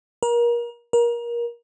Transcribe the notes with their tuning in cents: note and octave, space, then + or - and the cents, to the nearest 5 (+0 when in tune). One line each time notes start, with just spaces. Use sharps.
A#4 +30
A#4 +25